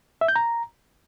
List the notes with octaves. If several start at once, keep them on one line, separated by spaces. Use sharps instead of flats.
E5
G6
A#5